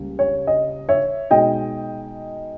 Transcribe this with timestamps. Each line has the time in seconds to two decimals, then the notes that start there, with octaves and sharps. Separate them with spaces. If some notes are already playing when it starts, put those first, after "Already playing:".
Already playing: C#2 C#3 G3 A#3 C#4
0.19 C#5
0.47 D#5
0.89 C#5 E5
1.31 B2 G#3 D#4 D#5 G5